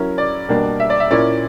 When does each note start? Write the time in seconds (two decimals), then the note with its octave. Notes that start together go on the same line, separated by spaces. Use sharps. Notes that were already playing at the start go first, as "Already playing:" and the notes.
Already playing: F#3 C#4 E4 A#4
0.18 D5
0.49 B2 G3 A#3 D4
0.80 E5
0.90 D5
1.00 E5
1.11 A#2 A#3 C#4 E4 D5